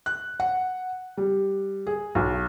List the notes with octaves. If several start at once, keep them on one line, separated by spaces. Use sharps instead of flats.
F#6
F#5
G3
G#4
B1